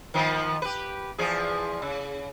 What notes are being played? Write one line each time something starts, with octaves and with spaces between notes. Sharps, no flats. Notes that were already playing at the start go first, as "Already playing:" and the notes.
D#3 F3 B3
G4 B4
E2 F3 G#4
C#3